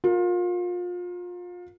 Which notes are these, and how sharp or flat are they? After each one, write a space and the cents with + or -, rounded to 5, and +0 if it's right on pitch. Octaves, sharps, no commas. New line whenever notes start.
F4 +30 A#4 +0